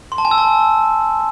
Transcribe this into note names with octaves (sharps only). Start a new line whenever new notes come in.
C6
A5
G#5
E6
A5